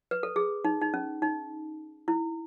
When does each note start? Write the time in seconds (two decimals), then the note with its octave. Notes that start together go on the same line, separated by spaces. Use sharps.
0.11 B4
0.23 A4
0.36 G#4
0.65 D#4
0.81 D#4
0.94 C#4
1.22 D#4
2.08 E4